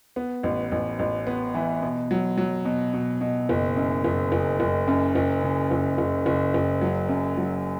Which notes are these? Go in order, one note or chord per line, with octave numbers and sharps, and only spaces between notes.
B3
A1
A1
A1
B3
E3
B2
F#3
F#3
B2
B2
B2
F#1
F#2
F#1
F#1
F#1
F#2
F#1
C#3
F#1
F#1
F#1
F#1
F#3
F#2
F#3